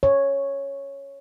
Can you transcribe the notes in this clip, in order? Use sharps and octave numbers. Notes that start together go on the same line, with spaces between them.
C#5